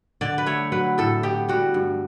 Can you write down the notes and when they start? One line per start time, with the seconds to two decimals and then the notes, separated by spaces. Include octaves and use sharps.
0.21 D3 D5
0.38 B4
0.46 A3 C#5
0.72 F#3 B4
0.98 A2 A4
1.23 B3 G4
1.49 G3 F#4
1.74 G2